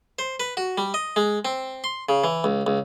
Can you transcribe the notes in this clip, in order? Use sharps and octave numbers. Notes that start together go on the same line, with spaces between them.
C5
B4
F#4
G3
D#5
G#3
C4
C6
C#3
E3
C#2
C#2